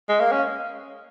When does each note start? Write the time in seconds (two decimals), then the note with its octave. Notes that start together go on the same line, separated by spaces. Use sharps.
0.09 G#3
0.20 A#3
0.32 C#4